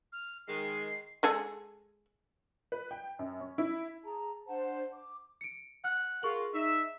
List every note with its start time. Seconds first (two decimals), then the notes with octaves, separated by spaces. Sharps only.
0.13 F6
0.48 D#3 G#3 C7
1.23 G#3 G#4 A4
2.72 B4
2.91 G5
3.19 F#2
3.40 C#4
3.58 E4
4.04 G#4 A5 A#5
4.47 D4 C5 F#5 A5
4.93 D6
5.41 C#7 D7
5.84 F#5 F6
6.23 F4 G#4 A#4 C#6 F#7
6.54 D#4 E5